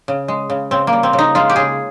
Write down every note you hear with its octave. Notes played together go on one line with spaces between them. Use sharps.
C#3
G#3
C#3
C#3 C4
A#3
G3
C4
C#3
D#4
G#3 F4
G4
C#3 G#4